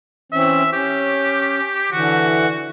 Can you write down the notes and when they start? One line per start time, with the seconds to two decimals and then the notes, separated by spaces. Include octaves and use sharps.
0.32 E3 C4 C#4 E5
0.73 C#4 G4
1.92 D3 E3 F#4